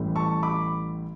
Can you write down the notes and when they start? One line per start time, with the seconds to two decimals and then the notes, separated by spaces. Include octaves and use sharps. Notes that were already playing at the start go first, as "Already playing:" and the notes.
Already playing: A1 A2 E3 G3
0.16 A5 C#6
0.43 B5 D6